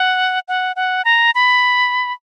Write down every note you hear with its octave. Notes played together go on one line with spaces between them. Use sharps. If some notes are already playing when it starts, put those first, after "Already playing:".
Already playing: F#5
F#5
F#5
A#5
B5